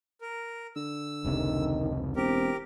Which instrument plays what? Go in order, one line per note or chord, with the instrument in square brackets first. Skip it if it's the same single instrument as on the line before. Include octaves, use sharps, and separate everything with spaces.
[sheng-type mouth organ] A#4
[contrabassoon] D3 [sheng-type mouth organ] E6
[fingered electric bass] F1 C#2 C3 [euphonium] D#3
[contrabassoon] E1 [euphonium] C4 [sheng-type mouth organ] G4 A#4